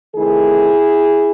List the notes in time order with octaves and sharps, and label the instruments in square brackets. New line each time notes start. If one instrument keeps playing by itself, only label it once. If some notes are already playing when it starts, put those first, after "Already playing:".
[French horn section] C3 D#3 A3 E4 G#4